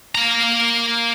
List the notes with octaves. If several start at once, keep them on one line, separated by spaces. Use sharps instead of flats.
A#3 A#5